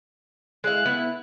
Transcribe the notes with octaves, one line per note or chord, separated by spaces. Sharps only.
G#3 E4 F5 F#6
B3 E4